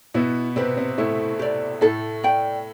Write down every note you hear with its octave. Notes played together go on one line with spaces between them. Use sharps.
B2 B3 E4
C3 C4 G4 B4
C3 C4
A2 A3 E4
G4 D5
A2 A3 A4
D5 G5